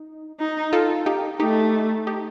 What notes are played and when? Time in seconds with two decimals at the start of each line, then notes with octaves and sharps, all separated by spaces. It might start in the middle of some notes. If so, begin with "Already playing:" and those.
Already playing: D#4
0.39 D#4
0.73 F4 A4
1.06 D#4 G4
1.40 A3 D#4 G4
2.07 D#4 G4